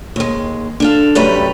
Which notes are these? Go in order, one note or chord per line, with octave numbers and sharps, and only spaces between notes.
D#2 G#3
D4 A4 F5
F#2 C3 G3 A3 B4 A#5